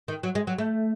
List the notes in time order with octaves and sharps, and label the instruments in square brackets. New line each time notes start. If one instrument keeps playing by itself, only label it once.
[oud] D#3
F#3
G#3
F#3
A3